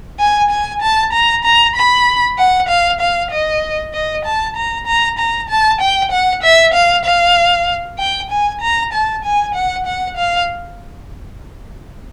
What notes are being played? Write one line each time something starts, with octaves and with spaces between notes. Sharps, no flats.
G#5
G#5
A5
A#5
A#5
B5
F#5
F5
F5
D#5
D#5
A5
A#5
A#5
A#5
A5
G5
F#5
E5
F5
F5
G5
G#5
A#5
A5
G#5
F#5
F#5
F5